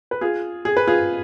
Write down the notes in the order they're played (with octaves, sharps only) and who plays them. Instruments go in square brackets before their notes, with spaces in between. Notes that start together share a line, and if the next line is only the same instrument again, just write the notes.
[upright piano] B4
F4 G#4
G#4
B4
F4 G#4